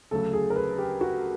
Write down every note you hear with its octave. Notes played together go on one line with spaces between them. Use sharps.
D2 C#3 F#3 A4
G#4
A#4
B4
G4
F#4